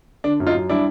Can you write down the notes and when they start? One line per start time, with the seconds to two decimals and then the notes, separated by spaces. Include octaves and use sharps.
0.24 D3 D4
0.40 F#2
0.47 D#4 F4
0.54 F#2
0.69 G3 D4 E4